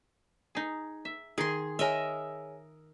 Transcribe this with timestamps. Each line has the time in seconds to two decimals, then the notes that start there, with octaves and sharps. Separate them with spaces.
0.55 D#4 G#4
1.05 E5
1.38 D#3 G#4 C6
1.79 G#4 A#4 C#5 D#5 E5 G#5